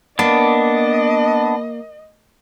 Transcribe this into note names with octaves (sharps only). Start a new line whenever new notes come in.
A#3 B3 D4 D#5